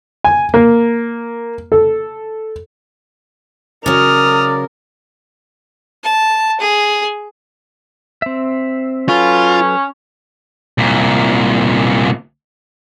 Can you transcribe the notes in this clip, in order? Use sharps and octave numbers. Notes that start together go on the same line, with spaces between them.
G#5
A#3
A4
C#3 F#3 A#4 D5 D#6 F6
A5
G#4
C4 E5
F#3 C#4 F4 A4 B4
C2 A#2